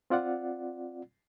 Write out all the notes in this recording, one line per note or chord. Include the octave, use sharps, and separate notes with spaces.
C4 F4 D5 F#5